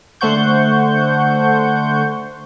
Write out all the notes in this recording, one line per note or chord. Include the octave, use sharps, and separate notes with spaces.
D3 A3 C5 F#5 C#6 G6